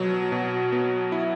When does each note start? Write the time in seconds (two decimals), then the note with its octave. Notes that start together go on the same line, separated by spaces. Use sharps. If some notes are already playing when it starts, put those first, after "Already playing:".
Already playing: B2 F#3
0.32 B2
0.72 B3
1.12 E4